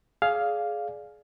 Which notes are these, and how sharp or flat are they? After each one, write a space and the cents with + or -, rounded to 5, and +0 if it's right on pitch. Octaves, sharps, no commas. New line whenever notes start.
G#4 +20 D5 +0 F5 +0